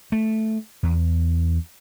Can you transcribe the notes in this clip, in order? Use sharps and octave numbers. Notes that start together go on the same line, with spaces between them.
A3
E2